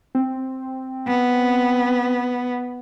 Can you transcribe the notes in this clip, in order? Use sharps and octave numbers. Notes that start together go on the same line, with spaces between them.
C4
B3